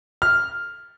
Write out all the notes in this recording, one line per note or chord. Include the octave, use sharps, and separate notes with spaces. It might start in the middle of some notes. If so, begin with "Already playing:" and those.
F6